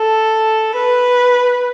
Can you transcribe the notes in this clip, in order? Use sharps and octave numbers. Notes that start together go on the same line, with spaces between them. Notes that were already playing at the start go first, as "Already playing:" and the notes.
Already playing: A4
B4